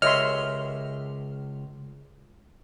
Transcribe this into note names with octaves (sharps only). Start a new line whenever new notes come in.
C#2 G4 A#4 C#5 D#5 E5 C6 F6